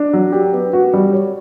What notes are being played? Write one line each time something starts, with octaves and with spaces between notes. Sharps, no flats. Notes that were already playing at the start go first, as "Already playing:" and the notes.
Already playing: D4
F#3
G4
B3
F#4
G3
C#5